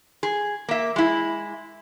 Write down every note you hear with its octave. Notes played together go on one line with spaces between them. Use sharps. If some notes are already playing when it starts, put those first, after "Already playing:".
G#4
A#3 E5
G#3 E4